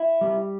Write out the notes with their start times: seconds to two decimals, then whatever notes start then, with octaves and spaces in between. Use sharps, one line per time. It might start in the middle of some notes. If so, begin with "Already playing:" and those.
Already playing: E4
0.21 G3